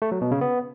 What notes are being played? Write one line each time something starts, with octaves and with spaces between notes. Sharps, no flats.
A3
F#3
B2
C#3
B3